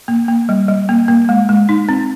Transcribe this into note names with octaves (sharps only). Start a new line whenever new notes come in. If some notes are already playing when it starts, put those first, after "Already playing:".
A#3
A#3
G3
G3
A#3
A#3
G#3
G#3
D#4
C4